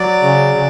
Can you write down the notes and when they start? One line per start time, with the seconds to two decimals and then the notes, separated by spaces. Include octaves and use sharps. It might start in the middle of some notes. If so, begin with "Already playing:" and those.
Already playing: F#3 D5
0.22 C#3
0.55 C#3